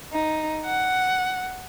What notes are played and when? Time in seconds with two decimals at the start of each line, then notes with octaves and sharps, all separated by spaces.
0.13 D#4
0.65 F#5